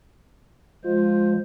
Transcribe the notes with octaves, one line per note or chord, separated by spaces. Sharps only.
F3 G#3 F4 C5